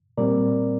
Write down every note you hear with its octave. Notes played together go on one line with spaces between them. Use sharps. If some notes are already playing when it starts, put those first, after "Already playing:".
A#2 G3 C4 A#4 D5